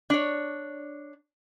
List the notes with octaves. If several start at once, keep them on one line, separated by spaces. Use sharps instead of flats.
D4 C#5